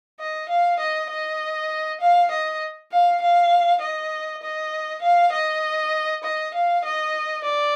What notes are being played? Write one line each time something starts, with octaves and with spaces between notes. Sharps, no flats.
D#5
F5
D#5
D#5
F5
D#5
F5
F5
D#5
D#5
F5
D#5
D#5
F5
D#5
D5